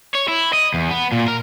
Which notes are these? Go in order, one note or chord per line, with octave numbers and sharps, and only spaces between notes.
C#5
E4
D#5
E2
B3
A#2
A#4